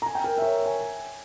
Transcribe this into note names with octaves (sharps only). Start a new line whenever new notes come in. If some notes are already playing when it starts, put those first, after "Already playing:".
A#5
G#5
G5
A#4
E5
C#5
G#5